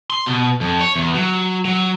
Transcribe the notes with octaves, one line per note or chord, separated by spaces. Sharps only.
C6
B2
F2
C#5
E2
F#3
F#3